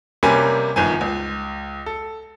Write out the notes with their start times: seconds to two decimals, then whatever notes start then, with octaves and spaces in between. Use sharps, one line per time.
0.23 C3 G3 A#3 C#4 B4 G#5
0.76 G1 D#3 F3 G#5
1.01 C#2
1.86 A4